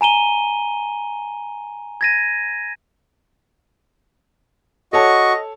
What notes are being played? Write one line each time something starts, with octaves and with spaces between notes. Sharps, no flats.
G#5 A#5 D#7 G7
G#6 A#6 D#7
F#4 A4 C#5 D#5 A5 C#6